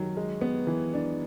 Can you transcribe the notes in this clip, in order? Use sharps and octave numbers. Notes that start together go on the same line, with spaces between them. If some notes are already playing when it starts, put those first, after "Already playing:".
Already playing: D#3 F#3
G#3
B3
E3
D4